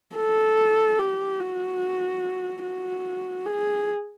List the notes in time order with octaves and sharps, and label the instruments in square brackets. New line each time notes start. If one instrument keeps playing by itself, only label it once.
[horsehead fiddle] A4
G4
F#4
F#4
G#4